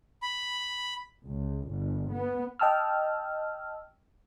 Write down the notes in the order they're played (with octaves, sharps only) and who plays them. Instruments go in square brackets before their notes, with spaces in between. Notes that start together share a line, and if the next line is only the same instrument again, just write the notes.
[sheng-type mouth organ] B5
[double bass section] C#2
G1
B3
[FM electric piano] D#5 G5 A5 E6 F6